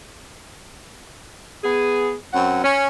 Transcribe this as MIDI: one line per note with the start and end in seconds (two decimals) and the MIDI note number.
1.63 2.14 59
1.63 2.14 68
2.33 2.61 42
2.33 2.61 60
2.33 2.61 61
2.33 2.61 78
2.63 2.87 61